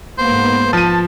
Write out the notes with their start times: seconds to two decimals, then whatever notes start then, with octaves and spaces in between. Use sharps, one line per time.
0.19 G#2 A#3 B3 C5
0.73 F3 A5 D#7